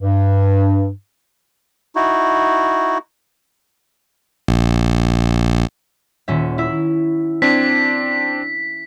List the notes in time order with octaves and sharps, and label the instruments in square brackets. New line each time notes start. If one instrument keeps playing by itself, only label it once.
[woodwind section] G2
[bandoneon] D#4 E4 F#4
[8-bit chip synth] A#1
[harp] D#1 C#4 E5
E4 E5
[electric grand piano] C4 D4 [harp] G#6 [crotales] B6